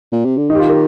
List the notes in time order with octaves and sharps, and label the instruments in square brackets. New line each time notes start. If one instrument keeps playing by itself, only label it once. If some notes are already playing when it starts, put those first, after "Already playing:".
[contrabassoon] A#2
C3
D3
[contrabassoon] D#3 [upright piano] D#4
[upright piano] G4
F4
A#4